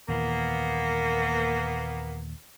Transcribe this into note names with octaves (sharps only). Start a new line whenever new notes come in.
D#2 A#2 E3 A#3 B3